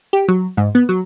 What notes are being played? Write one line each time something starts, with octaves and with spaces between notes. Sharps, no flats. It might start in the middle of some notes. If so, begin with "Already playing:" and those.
G4
F#3
G#2
B3
F#3